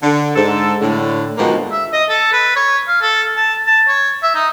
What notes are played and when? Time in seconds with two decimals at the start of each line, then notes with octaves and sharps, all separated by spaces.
0.03 D3
0.36 G#2 A4
0.81 A2 D3
1.38 G#2 B2 D3 D#3 F3 A#3
1.71 E5
1.93 D#5
2.09 A4
2.33 B4
2.56 C#5
2.88 F5
3.02 A4
3.36 A5
3.67 A5
3.88 C#5
4.23 E5
4.35 D#4